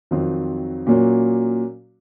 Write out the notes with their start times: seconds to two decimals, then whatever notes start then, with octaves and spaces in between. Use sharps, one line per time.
0.11 F2 D#3 F#3 C4 F4
0.87 A#2 F#3 A#3 C#4 F#4